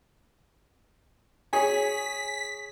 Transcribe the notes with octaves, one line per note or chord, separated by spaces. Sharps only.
G#4 C#5 G#5 B6